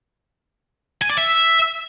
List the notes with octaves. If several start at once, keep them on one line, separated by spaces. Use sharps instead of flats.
G#5
D5
E5